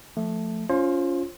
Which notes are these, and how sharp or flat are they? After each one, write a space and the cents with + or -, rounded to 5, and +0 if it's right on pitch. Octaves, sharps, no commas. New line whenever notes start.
F3 +0 A3 +0
C#4 +25 F4 +0 C5 +35